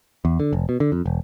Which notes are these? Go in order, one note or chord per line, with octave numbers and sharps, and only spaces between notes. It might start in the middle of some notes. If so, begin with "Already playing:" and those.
E2
D3
F1
B2
D3
F2
E1